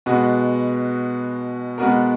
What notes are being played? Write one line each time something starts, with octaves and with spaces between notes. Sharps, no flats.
B2 G#3 B3 F#4
B2 G#3 B3 F#4 A#4